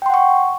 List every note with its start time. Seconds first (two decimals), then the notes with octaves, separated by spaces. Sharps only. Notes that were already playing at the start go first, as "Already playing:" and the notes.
0.02 G5
0.06 C6
0.10 F#5
0.14 C#6